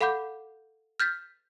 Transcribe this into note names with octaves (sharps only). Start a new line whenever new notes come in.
A4 F5 F#5 B5 D6 G6
F6 G6 A6 B6